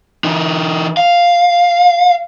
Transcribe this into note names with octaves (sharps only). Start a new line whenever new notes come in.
E3 D#4
F5